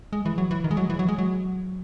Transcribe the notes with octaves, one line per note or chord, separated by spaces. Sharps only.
G#3
E3
F#3
E3
D#3
G#3
F#3
E3
F#3
G#3
F#3